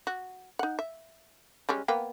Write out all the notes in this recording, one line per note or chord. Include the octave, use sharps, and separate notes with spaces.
F#4
D#4 F#5
E5
G3 G#3 C#4
A#3 B3 G5